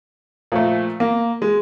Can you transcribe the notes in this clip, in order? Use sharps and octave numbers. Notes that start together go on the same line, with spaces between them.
A#2 F3 A3
A#3
G#3